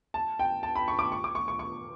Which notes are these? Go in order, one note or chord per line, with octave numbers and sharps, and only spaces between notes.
A5
G5
A5
B5
C#6
D6
C#6
D6
C#6
C#6
C#6